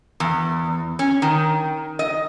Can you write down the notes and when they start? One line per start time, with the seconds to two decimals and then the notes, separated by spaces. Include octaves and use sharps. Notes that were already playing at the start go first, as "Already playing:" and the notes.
0.20 E2
0.99 C#4
1.22 D#3
1.99 D#5